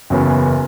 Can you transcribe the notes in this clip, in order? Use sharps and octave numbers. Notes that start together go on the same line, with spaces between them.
F#1 E2 C#3 F#3 B3